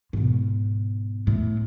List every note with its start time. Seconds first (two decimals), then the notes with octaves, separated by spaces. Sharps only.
0.13 G#2 B2
1.27 A2